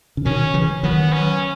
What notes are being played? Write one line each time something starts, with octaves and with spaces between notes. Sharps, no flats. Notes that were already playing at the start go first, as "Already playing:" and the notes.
C#3
B2 D#3 C#4
C#3 E3
D#3 F#3 B3
C#4